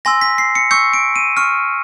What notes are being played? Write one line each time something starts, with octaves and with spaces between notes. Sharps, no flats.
G#5 C6 E6 A#6
B6
C7
C#7
C#6 E6 G6 C#7
D7
D#7
C#6 F6